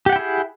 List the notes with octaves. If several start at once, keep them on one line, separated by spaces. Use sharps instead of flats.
E4 G4 G#4 F#5 G5